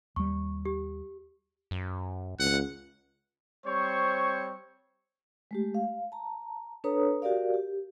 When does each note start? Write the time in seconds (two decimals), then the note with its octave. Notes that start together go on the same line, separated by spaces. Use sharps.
0.16 D#2 G3 C#6
0.65 G4
1.71 F#2
2.40 C#2 F#5
3.65 G3 C4 C5 C#5 C#6
5.51 G#3 A3 G4
5.75 F5
6.12 A5 A#5
6.84 D4 A4 B4 C#5 A#5 D#6
7.22 F#4 G4 A#4 D5 F5
7.54 G4